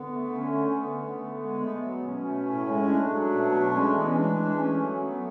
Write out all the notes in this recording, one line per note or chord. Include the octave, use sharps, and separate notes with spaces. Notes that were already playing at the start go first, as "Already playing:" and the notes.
Already playing: D3 B3
A3
D3 C#4
A3
D3 B3
A3
D3
G#3
A3 B3
F#3
B2 C#4
A3
A2
G#3
A3 D4
F#3
B2
A3
G#3 C#4
D4
E3 B3
C#4
G#3 D4
E3
A3 C#4
F#3
A3 B3